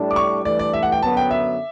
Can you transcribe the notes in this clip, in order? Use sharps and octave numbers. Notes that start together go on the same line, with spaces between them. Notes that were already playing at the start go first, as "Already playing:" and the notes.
Already playing: A2 G3 D4
D6
C#6
G2 E3 A3 D5
D5
E5
F#5
G5
F#2 D3 F#3 B3 A5
G5
E5